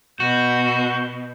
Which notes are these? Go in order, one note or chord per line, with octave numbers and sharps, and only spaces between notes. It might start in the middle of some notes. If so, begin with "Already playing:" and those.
B2 F#4 G6